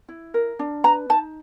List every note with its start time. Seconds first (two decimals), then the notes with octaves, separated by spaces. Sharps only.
0.09 E4
0.34 A#4
0.59 D4
0.84 B4 A#5
1.10 D#4 A5